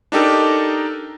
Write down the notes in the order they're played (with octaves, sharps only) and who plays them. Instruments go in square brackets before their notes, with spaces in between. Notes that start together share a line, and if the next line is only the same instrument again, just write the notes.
[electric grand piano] D4 D#4 G4 A4 A#4